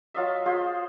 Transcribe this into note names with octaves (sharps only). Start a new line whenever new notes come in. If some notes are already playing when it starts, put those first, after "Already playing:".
F#3 F4 D#5 E5
F4 G#4 C5